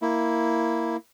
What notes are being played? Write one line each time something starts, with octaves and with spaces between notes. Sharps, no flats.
A#3 E4